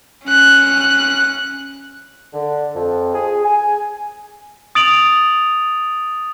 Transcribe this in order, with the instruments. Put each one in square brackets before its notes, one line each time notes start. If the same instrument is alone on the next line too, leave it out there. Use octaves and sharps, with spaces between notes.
[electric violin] C#4 F#6
[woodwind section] D3
F2
G#4
G#5
[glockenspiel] D#6 A6 D7 F7 F#7